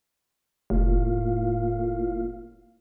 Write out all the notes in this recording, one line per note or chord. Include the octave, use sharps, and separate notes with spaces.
F1 A2 A#3 F4 F5